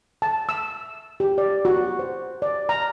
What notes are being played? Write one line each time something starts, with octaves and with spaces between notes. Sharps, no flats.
A5
E6
G4
D5
F#4
C5
D5
A#5